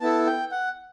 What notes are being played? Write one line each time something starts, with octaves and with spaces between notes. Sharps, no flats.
B3 E4 A4 A5
G5
F#5